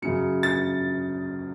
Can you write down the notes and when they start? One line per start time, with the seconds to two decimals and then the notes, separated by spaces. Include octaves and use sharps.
0.02 F#2 C#3 F#3 C#7
0.43 A6